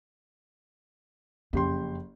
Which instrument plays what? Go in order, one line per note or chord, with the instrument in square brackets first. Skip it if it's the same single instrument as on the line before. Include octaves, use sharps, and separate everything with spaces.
[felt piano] F#1 G4 C6 [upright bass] F2